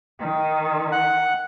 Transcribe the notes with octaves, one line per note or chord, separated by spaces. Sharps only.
D#3
F#5